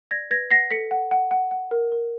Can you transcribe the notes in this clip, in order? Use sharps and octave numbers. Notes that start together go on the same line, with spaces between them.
D5 G#6 A#6
B4 G#6 A#6
F#5 A#6 C7
A4 B6 C#7
F#5
F#5
F#5
F#5
A#4
A#4